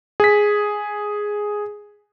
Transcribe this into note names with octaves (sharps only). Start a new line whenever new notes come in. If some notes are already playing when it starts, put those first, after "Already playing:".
G#4 B6